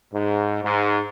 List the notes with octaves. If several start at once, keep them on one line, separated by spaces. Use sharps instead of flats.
G#2
G#2